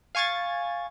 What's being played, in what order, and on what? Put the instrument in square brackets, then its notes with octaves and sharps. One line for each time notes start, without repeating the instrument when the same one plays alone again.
[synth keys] F5 G#5 C#6 G#6 A6